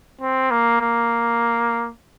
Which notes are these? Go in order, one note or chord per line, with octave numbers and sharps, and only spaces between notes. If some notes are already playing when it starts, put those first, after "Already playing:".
C4
A#3
A#3